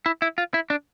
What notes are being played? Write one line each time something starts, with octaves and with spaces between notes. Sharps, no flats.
E4
E4
F4
E4
D4